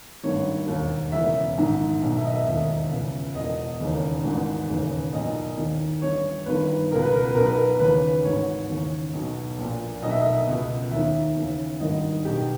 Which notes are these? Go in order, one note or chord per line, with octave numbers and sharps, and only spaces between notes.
G#1 G2 D#3 C#5
E1 D#2 D#3
E1 E2 C#3 E3 E5
A#1 G#2 D#3
B1 B2
E5
D#5
E5
E1 D#2 D#3
C#2 C#3 E3
E1 E2 B2 D#5
E1 D#2 C#3 E3
G#1 G#2 E3
E1 D#2 C#3 E3
B1 A#2 D#5
D#2 D#3
G1 G2 E3 C#5
G1 G2 D#3 B4
C#2 B2 A#4
B4
A#4
B4
B1 B2 A#4
B4
A#4
D#2 C#3 E3 B4
G#1 G#2 E3 C#5
D#2 C#3 E3
B1 B2
A#1 A#2
B1 B2 D#5
E5
D#5
C#2 B2
D#2 D#3 E5
D#2 C#3 E3
G#1 G2 D#3 D#5
B1 B2 G4